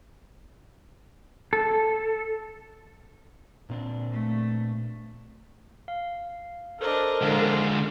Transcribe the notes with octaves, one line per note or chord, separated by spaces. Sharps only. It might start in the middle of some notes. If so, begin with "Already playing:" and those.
A4
A#2 C4 D4
A3
F5
D4 A4 A#4 C5 D#5
D3 G#3 F4 G#4